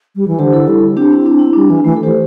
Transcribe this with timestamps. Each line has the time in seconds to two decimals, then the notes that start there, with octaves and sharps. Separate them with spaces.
0.16 G3
0.28 E3
0.39 D3 G4 C5
0.53 E4 A4
0.68 G3
0.97 C4 D4 G4
1.12 E4
1.26 D4
1.39 E4
1.53 G3 D4
1.70 E3
1.84 E3 A3
1.96 A4
2.03 E3 G4 C5